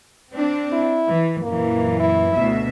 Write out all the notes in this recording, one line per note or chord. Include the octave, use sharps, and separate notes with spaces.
C4 D4
E4
E3
F#2 A#2 E3 A#3
E4
D2 B2 E5